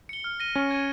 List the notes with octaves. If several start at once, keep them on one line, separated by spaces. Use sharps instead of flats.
C#7 G7
F6
A#6 D#7 G7
C#4 C#6
G#6 D#7